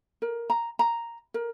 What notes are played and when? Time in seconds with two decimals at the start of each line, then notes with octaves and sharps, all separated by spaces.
0.22 A#4
0.50 A#5
0.79 A#5
1.34 A#4